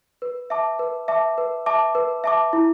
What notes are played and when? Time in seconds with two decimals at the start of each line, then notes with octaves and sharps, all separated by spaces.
0.22 B4
0.50 E5 A5 D6
0.79 B4
1.08 E5 A5 D6
1.38 B4
1.66 E5 A5 D6
1.95 B4
2.24 E5 A5 D6
2.53 E4